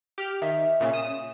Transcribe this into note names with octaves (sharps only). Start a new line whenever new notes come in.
G4 F6
D#3 E5
A#2 C#3
D#6 E7